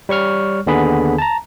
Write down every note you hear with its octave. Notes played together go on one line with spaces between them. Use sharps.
G3 C#5 C#6 F6
D#2 D3 B3 G#4 B5
A5 A#5